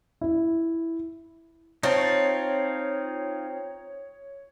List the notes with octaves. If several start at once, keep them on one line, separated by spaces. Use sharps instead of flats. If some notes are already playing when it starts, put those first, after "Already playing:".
E4
C4 D#4 F4 C#5 A5